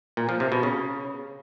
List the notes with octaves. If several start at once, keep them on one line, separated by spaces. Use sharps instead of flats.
A#2
F3
C3
B2
C#3